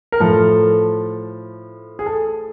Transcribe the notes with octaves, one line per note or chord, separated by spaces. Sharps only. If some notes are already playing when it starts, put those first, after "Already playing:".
A#4
A2 F3 A4
G#4
A4